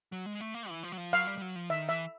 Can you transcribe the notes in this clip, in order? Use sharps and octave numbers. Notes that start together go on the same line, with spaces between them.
F#3
G#3
A3
A#3
E3
F3
F#3
F3
F#3 F5
G3
G3
F#3
F3
D#3 E5
E3 E5